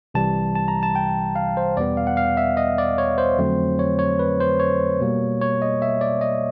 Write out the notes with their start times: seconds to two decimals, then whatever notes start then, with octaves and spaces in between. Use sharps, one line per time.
0.14 C2 C3 E3 G3 A5
0.55 A5
0.68 A#5
0.83 A5
0.95 G5
1.36 F5
1.57 C5
1.77 E2 B2 G3 B3 D5
1.97 F5
2.07 F#5
2.17 F5
2.37 E5
2.57 D#5
2.78 D5
2.98 C#5
3.18 C5
3.38 F2 D3 F#3 A3 C4
3.79 C#5
3.99 C#5
4.19 B4
4.40 C5
4.59 C#5
5.00 B2 G3 A#3
5.42 C#5
5.62 D#5
5.82 E5
6.01 D5
6.21 D#5